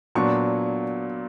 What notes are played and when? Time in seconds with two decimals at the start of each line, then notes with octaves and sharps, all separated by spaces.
0.15 A#2 F#3 B3 D4 C#6